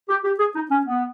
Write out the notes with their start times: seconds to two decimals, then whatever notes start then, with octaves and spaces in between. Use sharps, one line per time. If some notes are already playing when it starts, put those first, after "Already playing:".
0.09 G4
0.24 G4
0.39 G#4
0.55 D#4
0.71 C#4
0.86 B3